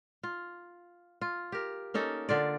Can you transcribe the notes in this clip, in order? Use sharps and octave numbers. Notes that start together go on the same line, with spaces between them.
F4
F4
G4 A#4
A#3 C#4 D#4 A4
D3 F4 D5